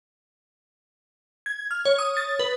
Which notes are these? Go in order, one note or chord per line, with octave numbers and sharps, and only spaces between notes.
G#6
F6
C#5
D#6
A6
B4